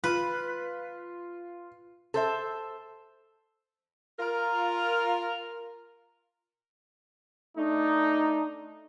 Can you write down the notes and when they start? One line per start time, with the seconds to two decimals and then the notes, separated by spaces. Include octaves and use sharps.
0.04 F4 B4
2.14 A4 C5 E5
4.19 F4 A#4
7.57 A3 D4 D#4